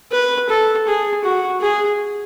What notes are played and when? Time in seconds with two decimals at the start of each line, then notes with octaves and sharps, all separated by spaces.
0.12 B4
0.49 A4
0.87 G#4
1.24 F#4
1.60 G#4